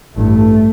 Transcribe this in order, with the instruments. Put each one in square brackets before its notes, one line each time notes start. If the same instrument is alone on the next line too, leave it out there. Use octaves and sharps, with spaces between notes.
[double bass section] A1 G2 A3